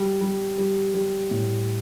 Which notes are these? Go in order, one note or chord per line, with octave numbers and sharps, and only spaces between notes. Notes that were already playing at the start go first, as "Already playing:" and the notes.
Already playing: G3
G3
G3
G3
A2